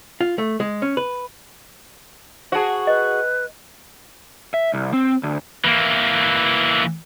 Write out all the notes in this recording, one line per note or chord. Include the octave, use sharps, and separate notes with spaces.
F4
A3
G#3
C#4
B4
F#4 G#4 C5 A5
B4 D#5
E5
C2
C4
D2
E3 A#3